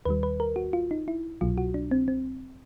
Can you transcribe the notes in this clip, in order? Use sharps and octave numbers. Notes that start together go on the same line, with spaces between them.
D#2 D#3 G3 B4
B4
A#4
F#4
F4
D#4
E4
C2 B2 F#3 F4
F#4
D4
C4
C4